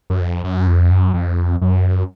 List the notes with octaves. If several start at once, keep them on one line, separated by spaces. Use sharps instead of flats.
F#2
F2
F#2
F2
F#2
F2
F#2